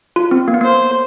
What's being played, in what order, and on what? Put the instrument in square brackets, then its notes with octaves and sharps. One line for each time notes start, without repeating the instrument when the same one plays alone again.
[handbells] F4
C4
A#3
B3
[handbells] A#3 [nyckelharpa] C5